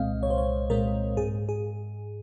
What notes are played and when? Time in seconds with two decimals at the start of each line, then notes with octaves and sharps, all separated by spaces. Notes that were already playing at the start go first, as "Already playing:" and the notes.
Already playing: C2 A#2 G#3 C4 D#5 F5
0.23 C2 C#5
0.30 C5
0.38 C#5
0.70 A#2 G#3 C4 A#4
1.17 G#2 G#4
1.49 G#4